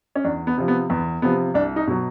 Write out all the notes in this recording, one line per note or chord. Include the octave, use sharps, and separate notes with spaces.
C#4
E2 D4
B3
C3 F3
B3
E2 B3
C3 F3 B3
C2 D4
D#4
B2 F#3